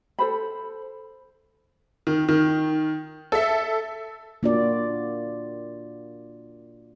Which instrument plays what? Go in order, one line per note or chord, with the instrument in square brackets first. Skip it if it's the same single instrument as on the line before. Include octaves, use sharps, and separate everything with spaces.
[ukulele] A4 C5 B5
[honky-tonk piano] D#3
D#3
A4 E5
[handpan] A#3 D4 F4 F#4 D5